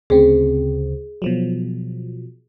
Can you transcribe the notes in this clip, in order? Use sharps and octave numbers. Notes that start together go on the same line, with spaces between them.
D2 C#3 C4 G#4
B2 F3 F#3